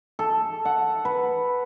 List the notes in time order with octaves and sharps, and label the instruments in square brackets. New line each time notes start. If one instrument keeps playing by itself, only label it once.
[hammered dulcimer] A4
F#5
B4